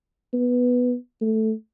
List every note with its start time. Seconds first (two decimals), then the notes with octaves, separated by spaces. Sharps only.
0.33 B3
1.21 A3